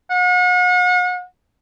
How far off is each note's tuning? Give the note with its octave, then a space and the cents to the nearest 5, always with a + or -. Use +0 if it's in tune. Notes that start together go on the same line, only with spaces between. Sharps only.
F#5 -40